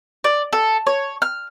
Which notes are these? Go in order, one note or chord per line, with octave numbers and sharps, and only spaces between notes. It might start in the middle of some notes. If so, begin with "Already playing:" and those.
D5
A4
C#5
F6